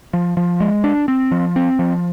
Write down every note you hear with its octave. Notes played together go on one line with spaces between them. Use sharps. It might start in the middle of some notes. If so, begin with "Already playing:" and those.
F3
F3
G#3
D4
C4
F3
C4
F3